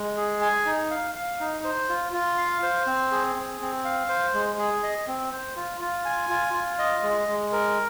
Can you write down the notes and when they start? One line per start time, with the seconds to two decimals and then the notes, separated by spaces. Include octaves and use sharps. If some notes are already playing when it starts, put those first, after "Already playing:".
Already playing: G#3
0.17 G#4
0.42 G#5
0.66 D#4
0.91 F5
1.15 F5
1.40 D#4
1.64 C5
1.89 F4
2.13 F4
2.38 F5
2.63 C5
2.87 C4
3.11 G#4
3.36 C4
3.61 C4
3.85 F5
4.09 C5
4.34 G#3
4.59 G#4
4.83 D#5
5.08 C4
5.32 C5
5.56 F4
5.81 F4
6.05 G#5
6.30 F4
6.54 F4
6.79 D#5
7.03 G#3
7.28 G#3
7.52 A#4